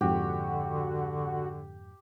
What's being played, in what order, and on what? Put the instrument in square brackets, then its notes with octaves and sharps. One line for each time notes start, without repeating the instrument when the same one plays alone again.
[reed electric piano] F2 G#2 [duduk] D3 [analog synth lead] F#4 [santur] G4